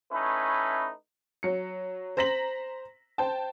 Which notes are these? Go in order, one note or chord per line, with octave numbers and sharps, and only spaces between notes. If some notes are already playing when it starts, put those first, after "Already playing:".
A3 C#4 D#4 E4 B4
F#3 C#7
C5 A#5 A#6 B6 F#7
C5 G5 A5